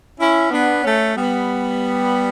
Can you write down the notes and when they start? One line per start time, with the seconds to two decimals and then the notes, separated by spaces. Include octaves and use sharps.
0.18 C#4 E4
0.51 B3 D4
0.83 A3 C#4
1.16 G3 B3